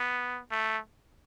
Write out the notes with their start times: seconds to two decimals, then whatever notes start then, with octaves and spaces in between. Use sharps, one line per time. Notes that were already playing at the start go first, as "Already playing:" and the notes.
Already playing: B3
0.51 A3